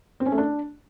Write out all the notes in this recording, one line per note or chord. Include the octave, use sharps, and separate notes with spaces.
C4
C#4
A3
D4